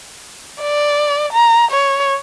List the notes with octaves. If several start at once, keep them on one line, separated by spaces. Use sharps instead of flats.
D5
A#5
C#5